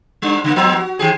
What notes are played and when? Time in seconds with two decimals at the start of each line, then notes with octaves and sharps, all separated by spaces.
0.22 G3 D4
0.44 C#3 A#3
0.56 F3 B3 C4
0.73 F#4
0.99 D#3 G4 G#4